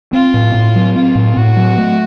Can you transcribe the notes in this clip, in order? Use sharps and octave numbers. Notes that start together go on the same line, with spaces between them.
C4 F4
A2
A2
F#3
C4 F4
A2
A2 F#4
F#3
A3